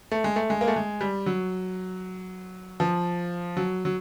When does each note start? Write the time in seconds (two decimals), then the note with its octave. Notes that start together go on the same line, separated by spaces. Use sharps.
0.12 A3
0.24 G#3
0.36 A3
0.50 G#3
0.61 A#3
0.68 A3
0.76 G#3
1.01 G3
1.26 F#3
2.80 F3
3.57 F#3
3.85 F#3